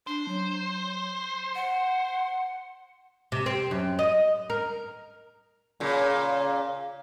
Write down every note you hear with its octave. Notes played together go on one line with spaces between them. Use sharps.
D4 C5
F#3
F#5
C3
C4
F#2
D#5
A#4
A#2 C#3